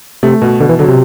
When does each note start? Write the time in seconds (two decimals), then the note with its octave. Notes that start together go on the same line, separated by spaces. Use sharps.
0.23 C3 A3
0.42 B2
0.60 B2 D3
0.69 E3
0.79 D3 F#3
0.88 C3